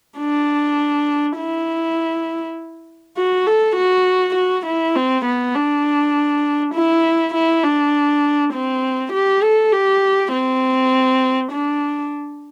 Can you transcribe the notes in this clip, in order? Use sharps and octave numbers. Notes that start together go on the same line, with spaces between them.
D4
E4
F#4
A4
F#4
F#4
E4
C4
B3
D4
E4
E4
D4
C4
G4
A4
G4
C4
D4